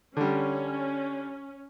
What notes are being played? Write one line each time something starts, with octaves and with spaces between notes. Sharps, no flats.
D3 G3 C#4